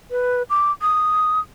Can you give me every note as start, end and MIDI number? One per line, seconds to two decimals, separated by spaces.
0.11 0.43 71
0.50 0.71 86
0.82 1.40 87